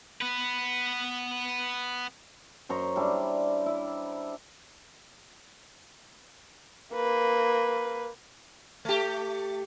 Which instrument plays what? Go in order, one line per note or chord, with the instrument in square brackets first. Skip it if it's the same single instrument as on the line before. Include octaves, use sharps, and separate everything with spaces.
[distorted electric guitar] B3 B4
[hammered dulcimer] F#2 C5 A#5 C#6
G3 D4 E4
E4
[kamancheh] A#3 B4
[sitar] A3 G4